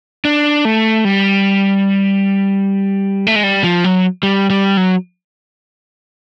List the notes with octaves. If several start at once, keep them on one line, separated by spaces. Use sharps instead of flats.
D4
A3
G3
A3
G#3
G3
F3
F#3
G3
G3
F#3